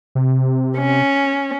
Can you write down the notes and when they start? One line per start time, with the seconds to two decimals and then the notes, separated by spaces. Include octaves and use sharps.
0.15 C3
0.77 C#4